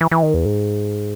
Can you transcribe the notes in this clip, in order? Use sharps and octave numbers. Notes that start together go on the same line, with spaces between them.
E3
E3
D#3
E2
G#2